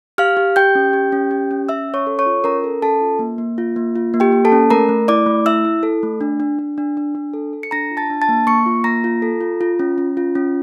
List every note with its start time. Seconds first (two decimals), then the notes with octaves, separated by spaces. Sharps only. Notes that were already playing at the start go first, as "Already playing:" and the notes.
0.18 G4 F5 F6
0.37 G4
0.56 G4 G5 G6
0.75 C#4
0.93 G4
1.12 C#4
1.31 G4
1.51 C#4
1.69 C#4 E5 E6
1.88 C#4
1.94 C#5 C#6
2.07 A4
2.19 C#5 C#6
2.26 F4
2.44 C#4 A#4 A#5
2.64 A4
2.82 C#4 A4 A5
3.02 F4
3.19 A#3
3.38 A#3
3.58 F4
3.76 A#3
3.96 F4
4.14 A#3
4.20 G4 G5
4.32 A#3
4.45 A4 A5
4.52 C#4
4.70 A3 A#4 A#5
4.89 A3
5.08 E4 D5 D6
5.26 A3
5.45 E4 E5 E6
5.65 E4
5.83 A4
6.03 A3
6.21 D4
6.40 D4
6.59 D4
6.78 D4
6.97 D4
7.15 D4
7.33 A4
7.53 A4
7.63 C#7
7.71 D4 A#5 A#6
7.91 F4
7.97 A5 A6
8.10 D4
8.22 A5 A6
8.29 A#3
8.47 A#3 C#6 C#7
8.66 F4
8.84 A#3 A#5 A#6
9.04 F4
9.22 A4
9.41 F4
9.61 F4
9.79 C#4
9.98 C#4
10.17 F4
10.35 C#4